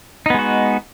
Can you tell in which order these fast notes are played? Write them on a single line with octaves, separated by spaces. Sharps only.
D#4 B3 G#3 F#4